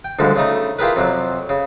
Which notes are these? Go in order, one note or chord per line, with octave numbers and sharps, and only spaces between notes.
G5
D2 G#2 D3 F3 G3
C#3 A3 D#4
E4 F4 G4 G#4 A#4 B4
F2 C3 F#3
C#3